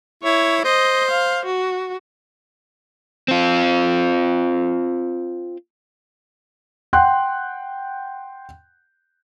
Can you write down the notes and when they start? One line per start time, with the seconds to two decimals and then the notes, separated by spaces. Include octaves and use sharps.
0.23 E4 C#5
0.65 C5 D#5
1.10 F5
1.45 F#4
3.28 C4 F4
6.93 F#5 G5 C6 F#6